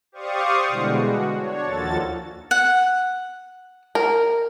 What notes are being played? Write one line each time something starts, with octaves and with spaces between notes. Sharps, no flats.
G4 C5 D5 F5 C#6 D#6
B2 D3 E3 G3 G#3 F#4
F#4
D4 C#5
D#2 A#2 F3 F#4 A4 A6
F#5
A#4